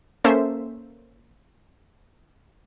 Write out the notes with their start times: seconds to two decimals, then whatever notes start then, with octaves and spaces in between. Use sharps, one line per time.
0.24 A#3 C#4 A4 C5 E5